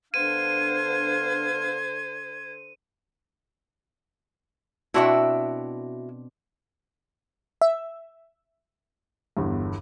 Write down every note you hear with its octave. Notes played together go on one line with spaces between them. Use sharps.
D3 B3 D4 C5 F5 G#6 D#7
B2 C4 D4 E4 F#4 E5
E5
G1 E2 G2